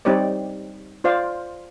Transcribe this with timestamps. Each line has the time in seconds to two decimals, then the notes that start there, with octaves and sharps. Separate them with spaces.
0.05 G3 C4 D#4 G4 C#5 D5
1.04 F4 C5 D5 F5